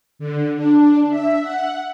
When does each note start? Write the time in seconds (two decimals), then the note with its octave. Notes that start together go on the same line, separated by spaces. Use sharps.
0.19 D3
0.56 D4
1.10 E5
1.41 F#5